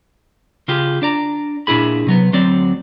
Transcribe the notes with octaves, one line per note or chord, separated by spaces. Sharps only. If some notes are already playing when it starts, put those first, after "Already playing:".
C#3 F4 G4 G#4
D4 D5 A#5
A#2 D4 E4 G#4 B5
C3 F#3 B3
D2 F#3 C4 D5